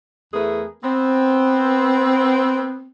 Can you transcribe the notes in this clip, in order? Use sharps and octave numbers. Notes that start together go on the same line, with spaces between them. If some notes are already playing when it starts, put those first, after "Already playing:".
E2 A3 B3 G#4 A#4
B3 C4